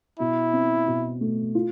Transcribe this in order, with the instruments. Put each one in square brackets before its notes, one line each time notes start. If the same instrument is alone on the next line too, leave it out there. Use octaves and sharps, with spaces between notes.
[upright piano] B2 [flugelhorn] E4
[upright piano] C4
B2
A3
F4